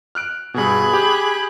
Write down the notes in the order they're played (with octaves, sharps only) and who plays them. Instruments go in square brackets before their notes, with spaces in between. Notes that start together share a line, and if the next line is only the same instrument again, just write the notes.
[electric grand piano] F6 F#6 D7
[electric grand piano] G2 B2 [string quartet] G#4 B5 F#6
[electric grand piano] G4